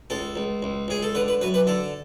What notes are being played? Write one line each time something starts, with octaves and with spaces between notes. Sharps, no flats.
C#2 A4
C#2
C#2
C#2 G#4
A4
D3 B4
B4
F#2 B4
B4
D3 A4